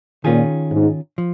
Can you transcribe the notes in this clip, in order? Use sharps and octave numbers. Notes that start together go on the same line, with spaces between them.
A#2 D#3 C#4 F4 G#4
G#2
F3